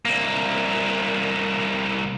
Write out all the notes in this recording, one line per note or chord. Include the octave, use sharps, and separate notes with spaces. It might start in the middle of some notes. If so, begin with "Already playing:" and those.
C2 A#3